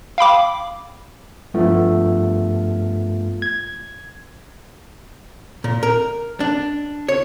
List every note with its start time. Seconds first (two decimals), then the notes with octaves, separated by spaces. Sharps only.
0.18 F5 G5 B5 D6
1.54 G2 F3 A3 B3
3.42 G#6
5.64 A#2
5.83 A#4
6.40 D4
7.08 C#5